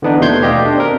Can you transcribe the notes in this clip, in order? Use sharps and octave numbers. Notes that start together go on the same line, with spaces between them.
D3 E3 B3 D4 D#4
D#2 B2 A3 C6 G6 G#6
G4 D5 D#5 F5
D4
C4 A#4